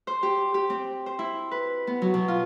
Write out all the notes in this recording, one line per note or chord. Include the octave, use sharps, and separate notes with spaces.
C5
G4
G4
C4
C5
E4
B4
B3
F#3
B2
F4